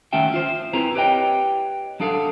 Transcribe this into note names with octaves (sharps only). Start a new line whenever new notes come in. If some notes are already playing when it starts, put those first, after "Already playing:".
D#3 A3 C#4 F#4 E5 G5
F4 C5
C4 E4 G#4 B4 A#5
G4 B4 C#5 D#5 G5
F#3 D4 G#4 A4 F5